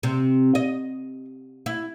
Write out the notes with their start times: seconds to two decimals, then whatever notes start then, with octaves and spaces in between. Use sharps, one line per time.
0.03 C3
0.55 D#5
1.66 E4